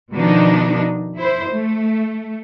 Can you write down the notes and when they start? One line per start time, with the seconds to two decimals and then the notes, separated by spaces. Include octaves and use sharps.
0.13 B2 D#3 F3 D4 D#4
1.16 E4 C5
1.50 A3